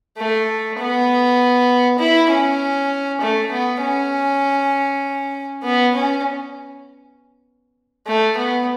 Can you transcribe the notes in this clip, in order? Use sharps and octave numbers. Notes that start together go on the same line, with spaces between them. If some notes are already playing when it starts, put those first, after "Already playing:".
A3
B3
E4
C#4
A3
B3
C#4
B3
C#4
A3
B3